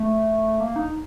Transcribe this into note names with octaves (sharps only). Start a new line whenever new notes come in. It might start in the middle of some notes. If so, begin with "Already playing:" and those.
Already playing: A3
A#3
D#4